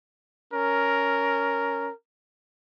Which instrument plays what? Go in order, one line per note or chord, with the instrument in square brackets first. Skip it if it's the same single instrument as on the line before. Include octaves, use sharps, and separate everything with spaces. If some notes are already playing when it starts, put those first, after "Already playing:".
[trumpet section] C#4 A#4